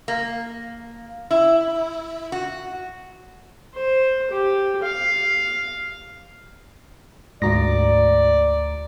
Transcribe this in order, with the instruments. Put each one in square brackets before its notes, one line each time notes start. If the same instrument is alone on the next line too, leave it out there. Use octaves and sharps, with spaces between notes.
[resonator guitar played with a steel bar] A#3
E4
F#4
[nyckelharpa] C5
G4
F5
[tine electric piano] D2 A#5 A#6 [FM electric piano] G#2 F#4 [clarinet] D5